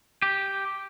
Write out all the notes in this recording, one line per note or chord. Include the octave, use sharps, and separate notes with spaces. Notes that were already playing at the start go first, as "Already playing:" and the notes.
G4